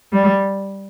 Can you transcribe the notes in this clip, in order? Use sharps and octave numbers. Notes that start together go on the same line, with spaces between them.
G3